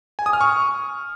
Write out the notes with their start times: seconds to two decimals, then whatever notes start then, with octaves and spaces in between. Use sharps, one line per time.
0.19 G#5
0.26 D#6
0.33 F6
0.41 C#6